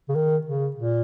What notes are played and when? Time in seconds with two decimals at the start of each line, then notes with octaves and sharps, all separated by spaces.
0.09 C#3
0.15 D#3
0.47 C#3
0.76 A#2